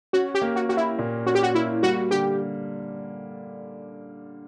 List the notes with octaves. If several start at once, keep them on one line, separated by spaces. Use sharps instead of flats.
C#4 F#4
G4
A#3
F#4
F#4 G4
E4
A#2
C#4 F#4
G4
F#4
A#3 E4
G3 F#4
D3 G4